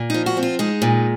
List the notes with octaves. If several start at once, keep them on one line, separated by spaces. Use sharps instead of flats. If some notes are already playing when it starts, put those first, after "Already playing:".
Already playing: A#2
F3 D#4
F#4
C4
F4
G#3 D#4
A#2